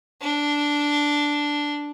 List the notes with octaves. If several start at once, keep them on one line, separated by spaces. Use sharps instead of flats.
D4